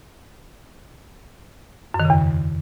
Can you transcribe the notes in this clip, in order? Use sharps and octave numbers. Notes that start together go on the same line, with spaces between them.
F#2
D#3
C#3
E2